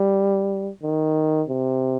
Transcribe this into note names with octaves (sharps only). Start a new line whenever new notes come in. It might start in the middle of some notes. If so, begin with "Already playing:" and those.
Already playing: G3
D#3
C3